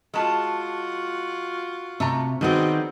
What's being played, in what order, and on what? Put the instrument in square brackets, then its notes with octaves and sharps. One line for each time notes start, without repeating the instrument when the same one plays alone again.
[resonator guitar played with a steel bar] G#3 A5 [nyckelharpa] F4 F#4
[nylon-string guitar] C3 [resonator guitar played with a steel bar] A3 A#5
[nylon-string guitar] D#3 D#4 F#4 [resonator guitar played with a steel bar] G3 B3 G#4 [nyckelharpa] C4